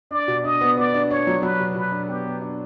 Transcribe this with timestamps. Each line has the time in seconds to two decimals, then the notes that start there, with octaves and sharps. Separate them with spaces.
0.11 D4 D5
0.28 B2
0.44 D4 D#5
0.61 B3
0.77 B3 D5
0.94 D4
1.10 D4 C#5
1.27 F#3
1.43 F#3 B4
1.60 B2
1.75 B2 B4
1.92 D4
2.09 B3 G4
2.25 B3
2.42 D4